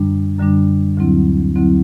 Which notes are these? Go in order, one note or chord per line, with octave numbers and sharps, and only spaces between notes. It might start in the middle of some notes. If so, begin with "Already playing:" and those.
Already playing: F#2 D3 G3 D4
F#2 D3 G3 D4
D2 D3 F#3 C4 E4
D2 D3 F#3 C4 E4